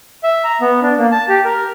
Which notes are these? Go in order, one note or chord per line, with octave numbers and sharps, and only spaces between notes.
E5
A#5
B3
D4
A#3
A5
G4
A#4